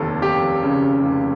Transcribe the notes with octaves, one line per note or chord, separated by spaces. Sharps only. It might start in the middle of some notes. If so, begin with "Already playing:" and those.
Already playing: F1 D#2 A4
F1 G4
C#3
F1